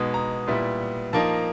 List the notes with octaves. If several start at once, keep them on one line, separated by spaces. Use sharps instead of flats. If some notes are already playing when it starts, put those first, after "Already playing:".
Already playing: B2 G#3 B3 D#4
A#5
A#2 G3 B3 E4
F3 A#3 D#4 A5